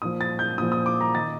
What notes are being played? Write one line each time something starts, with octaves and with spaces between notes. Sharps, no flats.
A#2 F3 D#6
A6
G6
A#2 F3 D#6
D#6
D6
A#5
D#3 A6